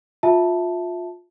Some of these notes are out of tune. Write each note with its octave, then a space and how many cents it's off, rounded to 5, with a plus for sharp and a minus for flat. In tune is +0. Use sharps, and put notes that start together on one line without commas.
F4 +20 E5 +0 A5 +0